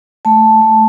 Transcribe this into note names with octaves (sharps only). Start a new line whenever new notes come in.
A3 A5
A3